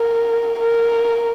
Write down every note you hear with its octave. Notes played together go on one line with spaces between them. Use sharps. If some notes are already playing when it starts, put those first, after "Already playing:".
Already playing: A#4
A#4